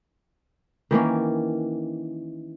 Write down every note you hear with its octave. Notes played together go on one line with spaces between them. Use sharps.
D#3 E3 A#3 C#4